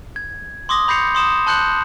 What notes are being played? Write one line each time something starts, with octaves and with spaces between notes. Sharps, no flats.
G#6
C6 D6 D#6 A#6
B5 G6 A#6 C7 C#7 F7
C6 D#6 E7
A5 C6 F#6 G6 C#7 F#7